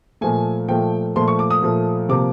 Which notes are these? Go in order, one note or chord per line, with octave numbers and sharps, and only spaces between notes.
A#2 F3 A3 G#5
A#2 F3 A3 G5
A#2 F3 A3 C6
C#6
D6
D#6
A#2 F3 A3
C3 F3 A#3 D6